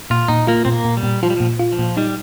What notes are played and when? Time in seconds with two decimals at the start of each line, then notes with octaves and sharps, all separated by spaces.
0.10 A#2 F4
0.28 A#2 D#4
0.47 A#3 F4
0.65 A#2 C4
0.72 A#3
0.85 A#2
0.97 G3
1.03 A#2
1.23 F3 F4
1.30 G3
1.37 A#2 F3
1.59 F4
1.72 F3
1.79 A#2
1.97 G3 D#4